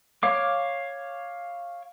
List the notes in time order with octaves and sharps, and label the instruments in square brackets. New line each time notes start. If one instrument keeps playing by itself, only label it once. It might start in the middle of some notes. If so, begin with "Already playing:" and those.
[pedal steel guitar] C#5 F5 D6